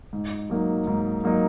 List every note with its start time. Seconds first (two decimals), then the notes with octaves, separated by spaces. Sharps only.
0.13 G#2
0.50 F#3 A#3 D#4
0.87 G#2
1.24 F#3 A#3 D#4